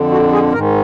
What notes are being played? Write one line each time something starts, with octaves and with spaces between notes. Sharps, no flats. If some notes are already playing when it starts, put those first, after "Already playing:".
Already playing: F2 D3
F#4
G#4
G#2 D#3 A#4